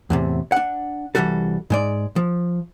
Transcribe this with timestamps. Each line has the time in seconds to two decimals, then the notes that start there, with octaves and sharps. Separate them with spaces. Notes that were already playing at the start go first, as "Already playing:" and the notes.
0.10 E2 A2 C3
0.52 D4 F#5
1.15 C2 A#2 E3 G3 F#4 A4
1.70 G#2 G#3 D5
2.16 F3